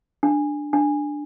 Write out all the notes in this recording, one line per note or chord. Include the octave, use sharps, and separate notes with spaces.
D4
D4